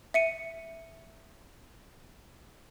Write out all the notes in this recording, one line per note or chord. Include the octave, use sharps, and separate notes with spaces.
E5 C#7 D#7